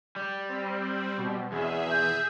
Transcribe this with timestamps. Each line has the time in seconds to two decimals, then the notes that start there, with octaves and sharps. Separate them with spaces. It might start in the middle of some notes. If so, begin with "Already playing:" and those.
0.16 G3
0.49 C4
1.18 B2
1.52 E2 G#4 E5
1.91 G6